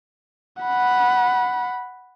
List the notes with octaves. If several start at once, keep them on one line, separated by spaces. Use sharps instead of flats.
F#5 B5